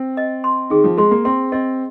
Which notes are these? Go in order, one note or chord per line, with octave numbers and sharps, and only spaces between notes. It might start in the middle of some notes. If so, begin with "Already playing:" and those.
Already playing: C4
D#5
C6
D#3 G#4
F3
G#3 C6
A#3
C4 C6
C4 D#5